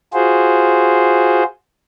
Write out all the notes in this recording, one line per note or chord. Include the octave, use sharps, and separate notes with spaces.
F4 F#4 G#4 C5